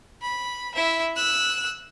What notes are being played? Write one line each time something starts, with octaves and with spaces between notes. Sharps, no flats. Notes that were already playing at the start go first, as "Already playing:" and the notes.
B5
E4 E5
E6 F#6